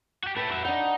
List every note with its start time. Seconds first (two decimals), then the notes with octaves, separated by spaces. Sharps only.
0.23 F#4 G4
0.36 A3 E4 B4
0.51 F#4 E5
0.65 D4 D#4 F#5